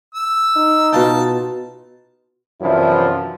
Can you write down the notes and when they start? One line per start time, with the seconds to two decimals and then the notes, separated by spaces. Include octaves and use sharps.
0.15 E6
0.56 D#4
0.93 B2 F4 G5 A5
2.61 F#2 C3 E3 F3 D4 E4